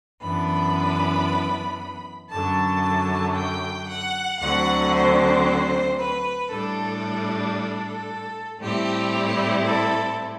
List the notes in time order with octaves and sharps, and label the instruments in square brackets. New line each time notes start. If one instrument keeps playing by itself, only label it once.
[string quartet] F#2 E3 B3 D4 B5
F#2 D3 F#3 A5
G5
F#5
D2 D3 F#3 C4 F#5
C5
B4
A2 G3 D4 A4
A4
A2 G3 C4 E4 G4
A4